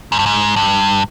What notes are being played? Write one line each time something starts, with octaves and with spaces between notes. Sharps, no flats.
G#2
G2
G#2
G2